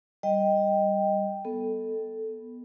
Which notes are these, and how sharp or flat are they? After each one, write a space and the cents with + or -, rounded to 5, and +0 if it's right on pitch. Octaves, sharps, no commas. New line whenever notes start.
G3 +0 D#5 +0 G5 +0
B3 +0 A4 +0